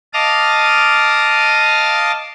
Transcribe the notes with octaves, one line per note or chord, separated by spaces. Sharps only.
D#5 F5 A5 D6 D#6 F6